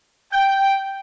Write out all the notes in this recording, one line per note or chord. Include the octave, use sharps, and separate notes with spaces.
G5